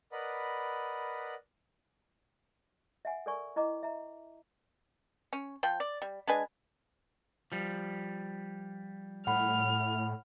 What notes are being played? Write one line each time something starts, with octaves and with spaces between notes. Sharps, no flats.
A#4 B4 D5 D#5 F#5 B5
E5 F#5 G#5
A4 A#4 D5 G#5 C#6
E4 D#5 A#5 D6
E5 A#5
C#4
F3 G5
D5
G3
G#3 D4 B4 G#5
F3 G3
A2 F#5 B5 F6